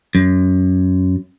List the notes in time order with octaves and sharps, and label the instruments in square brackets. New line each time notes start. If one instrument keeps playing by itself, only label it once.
[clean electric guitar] F#2